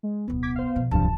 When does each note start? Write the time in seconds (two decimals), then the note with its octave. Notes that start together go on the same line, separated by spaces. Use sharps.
0.03 G#3
0.28 D1 B1 B3
0.43 D6 G#6 B6
0.56 C5 F5
0.76 F2 B2
0.91 D1 C2 G2 C3 F3 A5